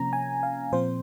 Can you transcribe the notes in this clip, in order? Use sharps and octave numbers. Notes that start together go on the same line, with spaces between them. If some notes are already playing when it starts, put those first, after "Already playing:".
Already playing: C3 F3 A#3 C#4 A#5
G#5
F5
A#2 F3 C4 C5